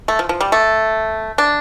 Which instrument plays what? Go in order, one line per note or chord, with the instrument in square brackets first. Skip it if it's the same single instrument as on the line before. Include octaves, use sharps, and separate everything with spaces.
[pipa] A3
F3
F3
G3
A3
D4